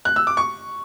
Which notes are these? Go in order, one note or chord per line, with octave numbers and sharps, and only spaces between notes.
F#6
E6
D6
C#6